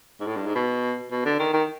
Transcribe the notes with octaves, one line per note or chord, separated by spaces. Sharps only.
G#2
A2
G2
G#2
B2
B2
D3
D#3
D#3